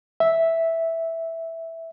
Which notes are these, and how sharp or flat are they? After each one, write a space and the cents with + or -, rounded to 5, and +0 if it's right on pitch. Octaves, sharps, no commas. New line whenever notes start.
E5 -5